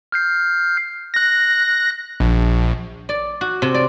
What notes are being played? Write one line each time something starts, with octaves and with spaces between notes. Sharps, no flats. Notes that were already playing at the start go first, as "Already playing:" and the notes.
F6 G6 C7
F#6 A#6
A#1
D5
F#4
C3
D5